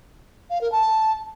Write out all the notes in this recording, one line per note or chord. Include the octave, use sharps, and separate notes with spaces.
F5
A#4
A5